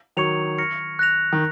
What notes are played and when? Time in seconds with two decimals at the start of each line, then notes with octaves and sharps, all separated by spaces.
0.17 D#3 F#3 C#6 G#6 C#7 F7
0.58 C#6 F6 A#6 C#7
0.99 F#6 A#6 F7
1.33 D#3